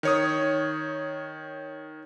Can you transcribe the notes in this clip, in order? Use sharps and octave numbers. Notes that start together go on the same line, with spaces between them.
D#3 C#5 D#6